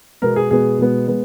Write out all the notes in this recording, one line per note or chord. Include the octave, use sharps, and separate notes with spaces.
B2 G#3 B3 A#4
G#4
B2 G#3 B3 G#4
B2 G#3 B3
G#3 B3